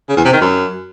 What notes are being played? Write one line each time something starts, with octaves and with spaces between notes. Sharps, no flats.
C#3
E2
C3
D#3
F#2